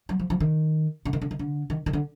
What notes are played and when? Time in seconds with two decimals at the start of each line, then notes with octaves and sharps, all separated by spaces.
0.09 F#3
0.19 F3
0.30 F3
0.40 D#3
1.05 D3
1.13 D#3
1.22 D3
1.31 D#3
1.39 D3
1.70 D#3
1.86 D#3
1.93 D3